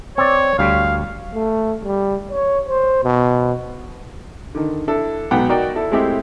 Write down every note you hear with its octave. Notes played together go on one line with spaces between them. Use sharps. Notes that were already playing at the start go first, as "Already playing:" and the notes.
C4 C#5 D5
D2 G3 F5
A3
G3
C#5
C5
B2
D3 D#3
D4 E4 A4
B1 G#2 B3 F#5 G5
D#4 F#4 A#4 D5 G5
E4 A4
G#3 A3 C4 E4 G4